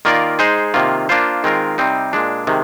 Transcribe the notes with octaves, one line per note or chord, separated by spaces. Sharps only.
D#3 A#3 F4 A#4 D5
G#3 D#4 G#4 C5
C3 D#3 A#3 F4
A#3 D4 F4 C5
D#3 G#3 C4 F4 A#4
C3 G3 C4 D#4
A#2 G#3 D4
C3 D#3 G#3